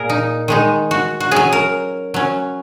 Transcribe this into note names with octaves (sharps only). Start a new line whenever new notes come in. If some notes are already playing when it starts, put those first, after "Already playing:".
Already playing: A#2 A#3 G#4 A#4
D#4
D#3 G#3 D#4
F#4
F#4
F#3 C#4 G#4
A#4
F#3 C#4